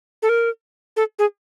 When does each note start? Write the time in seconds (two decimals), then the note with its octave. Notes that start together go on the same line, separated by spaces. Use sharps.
0.22 A4
0.29 A#4
0.96 A4
1.19 G#4